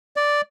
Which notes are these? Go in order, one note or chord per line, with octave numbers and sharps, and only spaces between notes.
D5